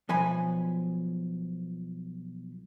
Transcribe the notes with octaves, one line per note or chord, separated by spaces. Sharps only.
B1 F3 G#5 B5